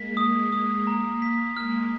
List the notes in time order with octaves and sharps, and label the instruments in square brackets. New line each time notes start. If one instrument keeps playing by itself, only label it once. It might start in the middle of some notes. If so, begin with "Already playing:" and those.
Already playing: [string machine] G#3 A#3 [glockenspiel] B6
[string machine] A#3 [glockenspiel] D#6
[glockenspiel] D#6
A#5
B6
[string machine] G#3 [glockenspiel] F6